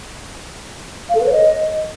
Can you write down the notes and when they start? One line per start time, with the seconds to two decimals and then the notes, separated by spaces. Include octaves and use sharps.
1.09 F5
1.15 A4
1.21 B4
1.27 C#5
1.32 D#5